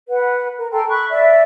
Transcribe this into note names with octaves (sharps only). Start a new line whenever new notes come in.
B4 F#5
A#4
A4 G5 A#5 C6
B5 C#6 F#6
D5 E5